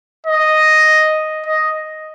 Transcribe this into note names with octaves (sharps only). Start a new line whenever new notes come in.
D#5
D#5